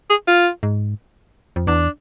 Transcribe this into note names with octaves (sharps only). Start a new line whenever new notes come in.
G#4
F4
G#2
F2
E2 D4